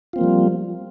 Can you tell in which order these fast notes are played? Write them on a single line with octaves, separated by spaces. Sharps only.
F4 C4 A#3 F3 G3